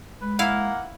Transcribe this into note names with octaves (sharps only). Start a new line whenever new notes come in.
G#3 B4
A#3 E4 F5 F#5